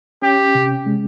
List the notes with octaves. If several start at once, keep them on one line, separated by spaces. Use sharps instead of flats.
C#4 G4
C3
G#3